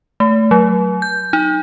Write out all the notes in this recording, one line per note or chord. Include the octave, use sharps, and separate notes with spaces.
A3
F#3
G6
D#4